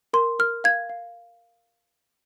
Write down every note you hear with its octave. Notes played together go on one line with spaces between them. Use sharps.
A#4 C6
A#4 F6
F5 G#6
F5